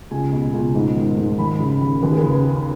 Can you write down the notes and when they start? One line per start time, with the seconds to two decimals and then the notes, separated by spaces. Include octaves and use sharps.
0.11 C#2 G#5
0.32 B2
0.53 C#2
0.75 G#2
0.96 D#3
1.17 G#2
1.39 D#2 B5
1.60 C#3
1.81 D#2
2.03 D#2 B4
2.11 G#4
2.19 C#3 B4
2.46 C#4